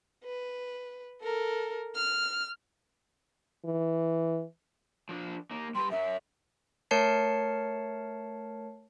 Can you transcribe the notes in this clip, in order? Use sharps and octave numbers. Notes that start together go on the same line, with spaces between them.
B4
A4 A#4
F6
E3
F3 D4
A#3 D#4
G3 A#4 B4 C6
F#2 F#3 E5
A3 A#4 C#5 A5 C7 C#7